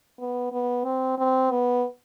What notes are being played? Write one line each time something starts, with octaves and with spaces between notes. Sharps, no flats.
B3
B3
C4
C4
B3